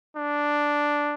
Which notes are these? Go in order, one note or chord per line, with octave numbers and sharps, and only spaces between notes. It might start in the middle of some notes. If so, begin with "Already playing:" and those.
D4